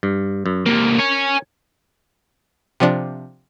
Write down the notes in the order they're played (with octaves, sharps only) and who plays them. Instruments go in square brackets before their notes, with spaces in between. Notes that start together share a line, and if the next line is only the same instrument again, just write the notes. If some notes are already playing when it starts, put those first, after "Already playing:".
[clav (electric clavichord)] G2
F#2
[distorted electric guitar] C3 A#3 [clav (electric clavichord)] A#4
[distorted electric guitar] C#5 G#5
[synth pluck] C3 F3 D4